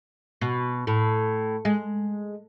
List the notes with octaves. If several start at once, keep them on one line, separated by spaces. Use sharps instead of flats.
B2
A2
G#3